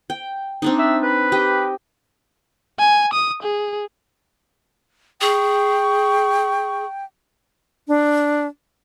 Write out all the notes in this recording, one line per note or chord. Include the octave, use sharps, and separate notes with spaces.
G5
C4 D4 D#4
E5
B4
G4 D#5
G#5
D#6
G#4
G#4 G5 C#6
D4